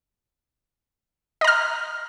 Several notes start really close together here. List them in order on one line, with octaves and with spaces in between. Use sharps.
D#5 A#5 F6